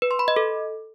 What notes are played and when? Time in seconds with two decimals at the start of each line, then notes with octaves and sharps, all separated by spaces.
0.02 B4
0.11 C6
0.19 B5
0.28 D#5
0.36 A4